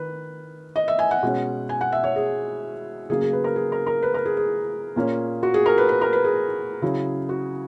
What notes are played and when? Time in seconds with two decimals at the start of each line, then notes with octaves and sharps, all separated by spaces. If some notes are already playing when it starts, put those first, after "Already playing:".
Already playing: D#3 B4
0.76 D#5
0.88 E5
0.99 G#5
1.11 F#5
1.23 B2 G#3 C#4
1.69 G#5
1.81 F#5
1.92 E5
2.04 C#5
2.16 G#4
3.10 C#3 F#3 A#3 G#4
3.21 G#4
3.33 B4
3.44 A#4
3.56 G#4
3.72 A#4
3.87 A#4
4.03 B4
4.14 A#4
4.26 G#4
4.37 G#4
4.96 A#2 A#3 C#4
5.43 F#4
5.54 G#4
5.66 A#4
5.78 B4
5.89 B4
6.01 A#4
6.13 B4
6.24 G#4
6.82 C#3 F#3 C#4 E4
7.29 F#4